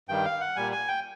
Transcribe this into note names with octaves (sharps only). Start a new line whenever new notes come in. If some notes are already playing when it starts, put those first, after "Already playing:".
G2 D#3 G3 G5
F5
F#5
A#2 G3 G#5
G#5
G5